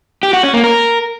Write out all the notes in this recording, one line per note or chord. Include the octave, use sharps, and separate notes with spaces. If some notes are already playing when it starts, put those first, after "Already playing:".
G4
F#4
C#4
A#3
A#4